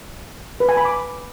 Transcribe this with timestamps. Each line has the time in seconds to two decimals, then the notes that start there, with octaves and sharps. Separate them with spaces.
0.60 B4
0.69 G#5
0.77 B5
0.85 D6